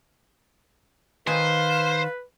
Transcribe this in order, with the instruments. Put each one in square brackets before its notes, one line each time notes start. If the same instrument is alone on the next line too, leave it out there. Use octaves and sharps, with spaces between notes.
[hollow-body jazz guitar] D#3 D#5 G#5 [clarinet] B4 [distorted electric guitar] C5 [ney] F5